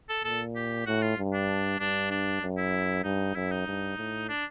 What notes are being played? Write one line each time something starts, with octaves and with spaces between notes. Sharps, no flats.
A4
A#2 A4
G4
A2 F#4
F4
G2
D4
G2 D4
D4
F#2
E4
G2 D#4
F#2 E4
D#4
G2
A2
D4